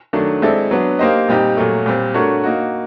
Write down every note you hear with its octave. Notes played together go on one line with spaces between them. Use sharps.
D#3 F#3 A3 D4
G#3 C4 E4 A4 D5
F#3 B3 D4
A#3 D#4 G4 C5 D#5
A#2 G3 C4 D#4 G4
A#2 F#3 A3
A#2 G3 C4
A3 D4 F#4 A#4 C#5
A#3 D#4 F#4